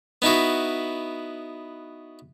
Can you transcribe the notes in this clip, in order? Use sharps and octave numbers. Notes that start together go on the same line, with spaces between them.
B3 D#4 E4 F#4